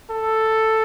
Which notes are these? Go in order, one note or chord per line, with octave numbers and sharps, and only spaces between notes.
A4